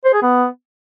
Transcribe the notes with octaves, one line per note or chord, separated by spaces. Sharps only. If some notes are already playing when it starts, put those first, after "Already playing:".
C5
G#4
B3